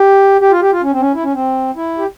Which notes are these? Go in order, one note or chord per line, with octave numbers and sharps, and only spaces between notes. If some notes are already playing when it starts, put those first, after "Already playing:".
Already playing: G4
G4
F4
G4
F4
C#4
C4
C#4
E4
C#4
C4
E4
G4